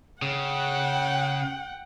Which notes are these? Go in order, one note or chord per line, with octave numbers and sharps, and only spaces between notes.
C#3 F#5 G5